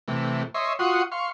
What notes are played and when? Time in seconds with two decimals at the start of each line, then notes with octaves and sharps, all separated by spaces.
0.08 C3 E3 A3
0.54 C#5 D#5 E5 C6
0.79 F4 F#4 F#5 C6 C#6 D#6
1.12 F5 C6 C#6